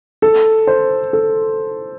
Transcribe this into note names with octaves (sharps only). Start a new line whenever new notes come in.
A4
C5
A4